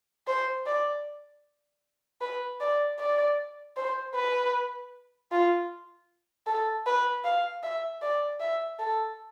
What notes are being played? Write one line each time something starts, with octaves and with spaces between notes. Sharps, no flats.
C5
D5
B4
D5
D5
C5
B4
F4
A4
B4
F5
E5
D5
E5
A4